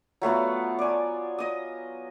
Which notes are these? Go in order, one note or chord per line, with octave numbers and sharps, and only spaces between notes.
F#3 A3 B3 F4
D5 G#5
D#5 D#6